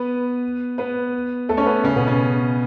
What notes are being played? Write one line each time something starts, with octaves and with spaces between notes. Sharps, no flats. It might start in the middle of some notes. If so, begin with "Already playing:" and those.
Already playing: B3 B4
B3 B4
A3 A4
C#4 C#5
B3 B4
C#3 C#4
B2 B3
C#3 C#4